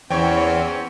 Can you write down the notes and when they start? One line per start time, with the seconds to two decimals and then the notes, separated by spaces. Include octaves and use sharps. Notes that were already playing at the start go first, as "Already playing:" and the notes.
0.11 E2 E3 C4 C#4 C#5 G5